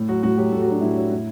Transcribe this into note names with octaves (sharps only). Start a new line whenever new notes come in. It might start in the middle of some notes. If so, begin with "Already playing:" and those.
Already playing: A2
F#3 F#4
A2 F#4
F#3 G4
A2 A4
F#4
F#3 D4
A2 E4
F#3
A2